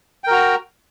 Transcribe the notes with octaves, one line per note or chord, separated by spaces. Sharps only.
F#4 A#4 G5 A#5